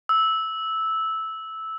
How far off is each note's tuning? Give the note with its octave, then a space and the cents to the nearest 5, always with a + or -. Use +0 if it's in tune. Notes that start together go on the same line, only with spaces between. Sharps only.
E6 -10